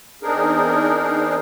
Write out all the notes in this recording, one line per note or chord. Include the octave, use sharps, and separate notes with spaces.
E2 C4 D4 D#4 G#4 A#4